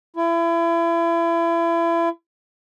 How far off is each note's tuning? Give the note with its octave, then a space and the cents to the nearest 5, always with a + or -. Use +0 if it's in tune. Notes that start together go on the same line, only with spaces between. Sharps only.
E4 +35